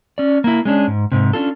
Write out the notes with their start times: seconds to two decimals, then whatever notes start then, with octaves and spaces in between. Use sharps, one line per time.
0.18 C#4 D5
0.44 A#3 E4
0.65 G#3 C#4 D4
0.88 G#2
1.12 G#2 C3
1.33 C#4 D4 F4 A4